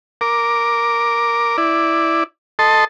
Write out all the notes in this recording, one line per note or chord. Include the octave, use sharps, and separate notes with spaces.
A#4 D6
E4 D5
A4 D#5 A5 C6